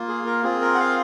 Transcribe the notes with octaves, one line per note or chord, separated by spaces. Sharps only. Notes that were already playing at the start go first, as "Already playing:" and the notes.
Already playing: A#3 F4
G#4
A#4
C4 F4 G#4
A#4
F#5
F5